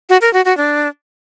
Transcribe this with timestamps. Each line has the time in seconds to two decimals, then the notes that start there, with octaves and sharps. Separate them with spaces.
0.10 F#4
0.21 A#4
0.33 F#4
0.45 F#4
0.57 D4